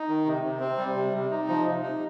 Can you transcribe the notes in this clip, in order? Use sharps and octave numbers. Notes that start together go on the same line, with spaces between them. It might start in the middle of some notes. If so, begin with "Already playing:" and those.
Already playing: D#4
D#3
C3
C3
C4
G3
C3
C3
D#4
F3
C3
D#4